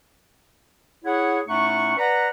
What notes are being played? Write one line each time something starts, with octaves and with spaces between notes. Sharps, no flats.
E4 G#4 C#5 F#5
A2 A3 C#4 D#4 F#5 C#6
B4 D5 F#5 A#5